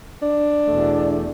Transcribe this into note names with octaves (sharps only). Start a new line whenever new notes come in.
D4
E2 B2 A3